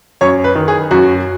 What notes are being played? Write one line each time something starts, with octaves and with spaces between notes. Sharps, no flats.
F#2 C#5
B4
D#3
G#4
F#2 F#4